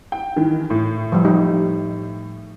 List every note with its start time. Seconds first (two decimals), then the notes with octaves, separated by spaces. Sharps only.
0.12 G5
0.36 D#3 E3
0.70 A2
1.12 F3 G3
1.25 G3 D#4 G4